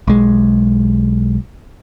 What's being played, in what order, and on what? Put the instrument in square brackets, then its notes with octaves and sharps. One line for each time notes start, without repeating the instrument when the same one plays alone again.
[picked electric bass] B1 G#3